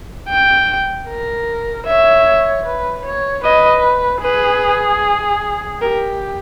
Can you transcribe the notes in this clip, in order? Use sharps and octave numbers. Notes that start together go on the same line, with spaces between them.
G5
A#4
C#5 E5
B4
C#5
B4 D#5
G#4 B4
G4 A#4